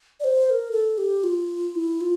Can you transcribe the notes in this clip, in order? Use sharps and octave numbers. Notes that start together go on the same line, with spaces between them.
D5
C5
C5
A#4
A4
G4
F4
E4
F4